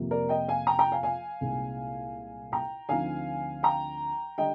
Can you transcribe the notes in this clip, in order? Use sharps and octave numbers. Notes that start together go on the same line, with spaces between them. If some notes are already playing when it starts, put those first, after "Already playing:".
Already playing: F2 C3 F3 A#3
A#4 D5
D#5 G5
F5 G#5
G5 A#5
G5 A#5
F5 G#5
F5 G#5
C2 A#2 G#3 C4 D#4
G5 A#5
D2 D3 F3 C4 D#4 F5 G#5
G5 A#5
D3 G3 D#5 G5